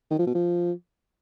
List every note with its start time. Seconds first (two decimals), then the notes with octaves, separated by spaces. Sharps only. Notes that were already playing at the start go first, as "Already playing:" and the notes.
0.11 D#3
0.19 F3
0.27 B2
0.35 F3